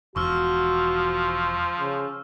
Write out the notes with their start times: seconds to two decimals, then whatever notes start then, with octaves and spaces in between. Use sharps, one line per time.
0.16 E1 F3 F#4 C#6 E6 F6
1.79 C#3